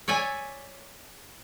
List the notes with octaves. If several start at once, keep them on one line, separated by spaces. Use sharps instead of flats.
C#5 D5 E5 G#5